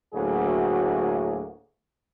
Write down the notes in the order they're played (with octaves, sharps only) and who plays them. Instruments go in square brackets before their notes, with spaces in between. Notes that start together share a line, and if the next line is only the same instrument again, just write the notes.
[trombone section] D2 A2 F#3 A#3 F#4 G#4